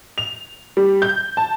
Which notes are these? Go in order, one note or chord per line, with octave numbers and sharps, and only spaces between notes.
F7
G3
G6
A5